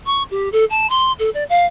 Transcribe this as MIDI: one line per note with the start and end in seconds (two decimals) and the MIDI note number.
0.06 0.23 85
0.31 0.49 67
0.52 0.65 69
0.70 0.89 81
0.90 1.12 84
1.19 1.30 69
1.34 1.44 74
1.49 1.66 77